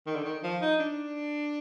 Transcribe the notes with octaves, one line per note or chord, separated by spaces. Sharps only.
D#3
D3
D#3
F3
D#4
D4